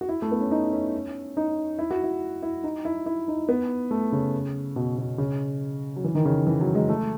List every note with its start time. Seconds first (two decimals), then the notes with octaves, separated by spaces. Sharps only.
0.01 F#4
0.09 E4
0.22 A3
0.31 B3
0.41 C#4
0.51 D#4
0.72 C#4
1.37 D#4
1.79 E4
1.91 F#4
2.04 E4
2.42 E4
2.64 D#4
2.85 E4
3.06 E4
3.28 D#4
3.49 B3
3.91 A3
4.12 C#3
4.76 B2
4.98 B2
5.18 C#3
5.96 F#3
6.04 E3
6.15 D#3
6.25 C#3
6.47 E3
6.61 F#3
6.75 G#3
6.89 A3